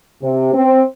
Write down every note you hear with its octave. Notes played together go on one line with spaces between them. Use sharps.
C3
C4